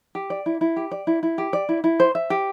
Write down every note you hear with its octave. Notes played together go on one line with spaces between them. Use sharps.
G4
D5
E4
E4
G4
D5
E4
E4
G4
D5
E4
E4
C5
E5
G4